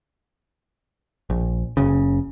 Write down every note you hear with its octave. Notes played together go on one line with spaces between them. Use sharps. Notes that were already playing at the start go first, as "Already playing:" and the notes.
A#1
F#1 C#3